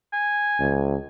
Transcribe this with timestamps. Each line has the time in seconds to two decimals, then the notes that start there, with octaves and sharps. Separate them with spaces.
0.13 G#5
0.60 C#2